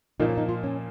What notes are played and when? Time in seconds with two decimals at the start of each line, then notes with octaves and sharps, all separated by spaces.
0.20 A#2 F3 A#3 D#4
0.29 C#4
0.37 D#4
0.49 F4
0.64 C#4